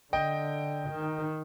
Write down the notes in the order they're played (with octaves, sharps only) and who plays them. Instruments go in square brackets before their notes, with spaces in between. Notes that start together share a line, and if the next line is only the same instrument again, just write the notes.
[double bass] D3 [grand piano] D#5 G5
[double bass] D#3